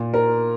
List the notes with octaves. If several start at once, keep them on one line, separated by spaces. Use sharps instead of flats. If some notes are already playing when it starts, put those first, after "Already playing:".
Already playing: A#2
A#4